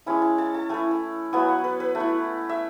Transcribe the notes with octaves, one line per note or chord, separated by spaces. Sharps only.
G#3 C#4 E4 A5
A5
A5
A5
A3 E4 G#5
A5
F#3 B3 E4 G#5
F#5
B4
B4
A3
E4
E5